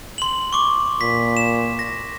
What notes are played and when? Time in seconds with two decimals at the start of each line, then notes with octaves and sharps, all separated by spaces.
0.18 C6 F#7
0.53 C#6 D6
1.01 A#2 B6
1.37 E7
1.79 A#6